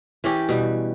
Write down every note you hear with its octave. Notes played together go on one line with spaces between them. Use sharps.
E3 C#4 G4
B2 G3